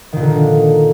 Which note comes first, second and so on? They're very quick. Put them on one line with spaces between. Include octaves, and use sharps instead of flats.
D#3 A#2 D3